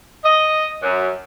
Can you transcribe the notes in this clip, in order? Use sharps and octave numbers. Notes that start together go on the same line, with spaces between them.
D#5
F#2